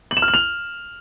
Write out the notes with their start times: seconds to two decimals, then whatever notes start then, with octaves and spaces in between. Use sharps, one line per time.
0.11 F#7
0.17 E7
0.22 F6
0.28 F#7
0.34 F7